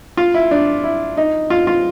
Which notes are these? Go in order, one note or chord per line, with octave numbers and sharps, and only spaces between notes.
F4
E4
D4
E4
D#4
F4
F4